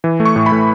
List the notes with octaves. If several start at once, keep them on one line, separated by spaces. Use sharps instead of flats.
E3
A3
C#6
A2
B5
A2